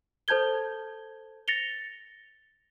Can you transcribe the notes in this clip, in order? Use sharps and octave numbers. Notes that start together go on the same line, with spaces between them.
A4 C5 A5 G6 G#6 G7
A6 A#6 C#7 F7 G7